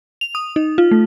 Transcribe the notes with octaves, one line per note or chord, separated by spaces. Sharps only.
F7
D#6
D#4
F4
A3